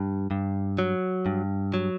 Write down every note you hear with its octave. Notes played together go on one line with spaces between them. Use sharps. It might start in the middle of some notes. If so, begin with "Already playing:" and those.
Already playing: G2
G2
F#3
G2
F#3